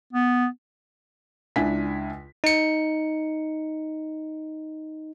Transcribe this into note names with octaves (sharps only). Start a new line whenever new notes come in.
B3
C#2 D4 E4 G#5 B6
D#4 C#7